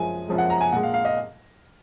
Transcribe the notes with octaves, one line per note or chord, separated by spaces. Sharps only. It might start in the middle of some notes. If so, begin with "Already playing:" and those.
Already playing: F#2 F3 G#3 G#5
F#2 F3 G#3
F#5
A#5
G#5
A#2 G#3 F#5
F5
F5
D#5